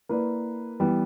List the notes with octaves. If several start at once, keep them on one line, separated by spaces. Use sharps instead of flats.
A#3 E4 B4 D5
E3 G3 B3